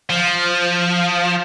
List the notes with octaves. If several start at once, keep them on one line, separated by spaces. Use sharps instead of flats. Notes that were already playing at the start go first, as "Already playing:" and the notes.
F3